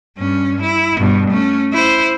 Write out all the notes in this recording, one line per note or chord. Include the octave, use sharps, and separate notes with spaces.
G2 C#4
E4
G2 B2
A3 C#4
E4 C5